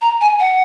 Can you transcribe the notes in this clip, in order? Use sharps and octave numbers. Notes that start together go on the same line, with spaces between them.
A#5
G#5
F#5